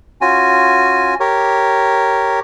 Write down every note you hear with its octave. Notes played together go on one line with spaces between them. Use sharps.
C#4 F4 F#4 G#5
G4 A#4 C#5